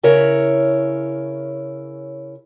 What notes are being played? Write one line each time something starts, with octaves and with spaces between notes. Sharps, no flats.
C#3 E4 A#4 C#5